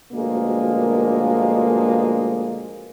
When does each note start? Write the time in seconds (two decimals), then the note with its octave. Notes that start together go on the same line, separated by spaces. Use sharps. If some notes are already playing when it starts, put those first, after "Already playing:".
0.13 D2 B2 F3 G#3 A#3